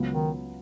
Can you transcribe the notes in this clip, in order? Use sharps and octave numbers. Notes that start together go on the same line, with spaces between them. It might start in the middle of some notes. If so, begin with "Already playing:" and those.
Already playing: C#2 C#3 F#3 B3
D#3